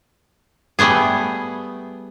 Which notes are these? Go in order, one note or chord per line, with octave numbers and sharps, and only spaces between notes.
G3 A3 B3 G#4